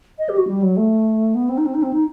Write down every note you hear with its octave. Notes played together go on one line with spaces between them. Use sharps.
D#5
G4
F#4
G3
F#3
A3
B3
C4
D#4
C4
D#4
C4
D#4